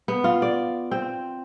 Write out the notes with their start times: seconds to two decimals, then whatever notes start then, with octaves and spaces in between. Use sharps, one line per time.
0.08 B3
0.24 F4
0.42 D5
0.91 C4